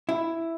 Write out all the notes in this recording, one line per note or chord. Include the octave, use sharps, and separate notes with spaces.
E4